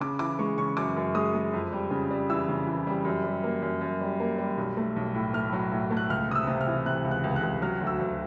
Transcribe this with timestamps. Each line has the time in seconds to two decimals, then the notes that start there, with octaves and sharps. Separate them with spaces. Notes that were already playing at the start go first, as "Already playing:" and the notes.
0.01 C#3 D6
0.19 E3 D6
0.39 G#3 C#6
0.57 C#3 C#6
0.77 F#2 D6
0.96 F#2
1.15 G#3 D#6
1.34 G#3
1.53 F2
1.73 G3
1.91 C#3
2.11 G3
2.30 E3 E6
2.49 C#3
2.67 E3
2.87 G3
3.05 F#2
3.24 G3
3.44 A#3
3.62 F#2
3.81 F#2
4.01 G3
4.20 A#3
4.38 G3
4.57 B1
4.77 A3
4.96 B1
5.14 A2
5.33 A3 F6
5.53 F#3
5.72 A2
5.91 A3
5.97 F#6
6.10 C#2 F6
6.28 C3 D#6
6.35 E6
6.47 C3
6.61 F6
6.67 E3
6.86 C3 F#6
7.04 C#2
7.11 F#6
7.24 C#2
7.36 F#6
7.43 C#2
7.62 F#3 F6
7.81 D2
7.87 E6
8.00 D2